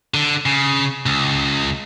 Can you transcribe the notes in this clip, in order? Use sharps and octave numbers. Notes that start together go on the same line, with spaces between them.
D3
C#3
C#2